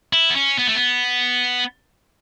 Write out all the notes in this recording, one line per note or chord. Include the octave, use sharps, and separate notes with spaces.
E4
B3
C#4
B3
A3
B3